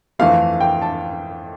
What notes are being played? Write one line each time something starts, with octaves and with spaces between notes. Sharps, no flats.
G1 F2 E3 A3 F5
G5
A5